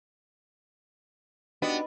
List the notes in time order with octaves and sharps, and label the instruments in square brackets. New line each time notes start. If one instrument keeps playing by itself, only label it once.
[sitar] B3 [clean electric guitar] D4 F#4 G4 [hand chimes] D#4 D#5